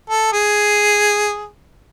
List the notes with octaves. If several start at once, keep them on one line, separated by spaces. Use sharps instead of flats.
A4
G#4